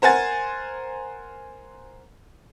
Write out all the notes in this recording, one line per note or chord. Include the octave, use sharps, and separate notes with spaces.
A#4 C5 F#5 G#5 A6